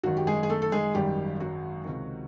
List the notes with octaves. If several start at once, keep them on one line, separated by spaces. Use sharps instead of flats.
G#1 F#2 D#3 F#3 F#4
G4
G#3 G#4
G#4
A3 A4
A4
G#3 G#4
G#1 F#2 D#3 G3 G4
F#3 F#4
C#2 C3 D#3